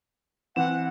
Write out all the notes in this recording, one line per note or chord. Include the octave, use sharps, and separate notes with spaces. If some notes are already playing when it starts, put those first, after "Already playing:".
E3 C4 F#5 E7